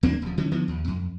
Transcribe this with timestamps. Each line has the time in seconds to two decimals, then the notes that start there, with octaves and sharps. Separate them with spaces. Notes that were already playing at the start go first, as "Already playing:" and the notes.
0.03 D#2 A#3 C4 D4
0.22 D#1 F3
0.38 D3 E3 C#4
0.51 D3 E3 F3 B3
0.68 D#2
0.88 F2